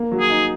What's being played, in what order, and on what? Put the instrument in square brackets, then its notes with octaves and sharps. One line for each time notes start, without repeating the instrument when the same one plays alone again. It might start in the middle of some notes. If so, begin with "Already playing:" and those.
Already playing: [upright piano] A#3
F#3
[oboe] G#4
[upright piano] D#4